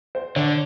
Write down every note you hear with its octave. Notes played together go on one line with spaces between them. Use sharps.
C5
D3 C#5